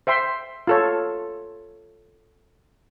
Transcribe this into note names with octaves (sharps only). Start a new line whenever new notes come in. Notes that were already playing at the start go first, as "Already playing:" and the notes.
C5 E5 G5 C6
F4 A4 C#5